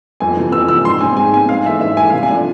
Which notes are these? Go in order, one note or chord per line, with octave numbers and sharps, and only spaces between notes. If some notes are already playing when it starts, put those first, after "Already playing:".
F2 G#5
C3 E3
F2 E6
C3 E3 E6
G#2 C6
G#3 C4 G#5
G#2 G#5
G#3 C4 G#5
G#2 F5
E3 A3 E5
G#2 E5
E3 A3 G#5
C3 F5
G#5
F3 A3 D4